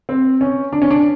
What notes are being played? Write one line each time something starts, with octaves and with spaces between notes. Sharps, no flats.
C4
C#4
D4
C#4
D4